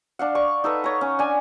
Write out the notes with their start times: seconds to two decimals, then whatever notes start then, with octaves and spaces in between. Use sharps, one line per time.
0.19 D4 F5 F#5
0.35 D5 C#6
0.64 D#4 A4 B4
0.84 C#5 A#5
1.01 C#4
1.19 D4 G#5